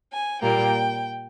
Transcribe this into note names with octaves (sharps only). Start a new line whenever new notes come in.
G#5
A#2 G3 A#3 G5